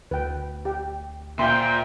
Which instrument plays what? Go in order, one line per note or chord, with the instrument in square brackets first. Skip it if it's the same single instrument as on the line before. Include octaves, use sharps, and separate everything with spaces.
[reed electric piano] D2 [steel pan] B4 G5
[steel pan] G4 G5
[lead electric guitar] A#2 [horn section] C5 E5 G5 [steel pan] F5 C6